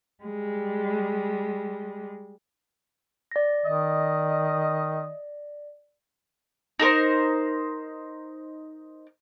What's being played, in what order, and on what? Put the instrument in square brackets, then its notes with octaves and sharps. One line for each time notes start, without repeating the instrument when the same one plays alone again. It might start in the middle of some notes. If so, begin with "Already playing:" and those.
[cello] G3 G#3
[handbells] D5 A#6
[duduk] D#3 [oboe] D#5
[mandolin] D#4 A4 A#4 C5